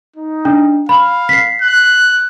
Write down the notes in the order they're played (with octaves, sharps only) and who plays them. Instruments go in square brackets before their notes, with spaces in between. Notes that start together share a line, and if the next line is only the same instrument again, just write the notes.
[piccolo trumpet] D#4
[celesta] D4
[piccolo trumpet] F5 [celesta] B5
[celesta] B6 C7
[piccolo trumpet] F#6